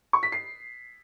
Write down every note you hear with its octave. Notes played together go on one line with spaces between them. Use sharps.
C#6
B6
C7